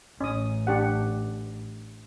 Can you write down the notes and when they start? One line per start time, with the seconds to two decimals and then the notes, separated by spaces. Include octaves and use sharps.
0.21 A1 C#4 D#6
0.67 D4 G4 F#5